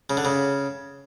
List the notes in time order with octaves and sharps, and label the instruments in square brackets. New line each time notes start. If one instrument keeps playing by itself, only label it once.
[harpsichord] C#3
D3
C#3